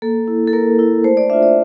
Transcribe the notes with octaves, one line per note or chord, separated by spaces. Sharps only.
A#3 A4
E4
A4
A#3 A#4
E4
A3 C5
D5
D4 F4 E5
D5